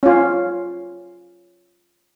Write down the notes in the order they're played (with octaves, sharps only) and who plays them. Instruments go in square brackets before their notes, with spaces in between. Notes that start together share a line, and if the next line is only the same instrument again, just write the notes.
[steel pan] C#4 F4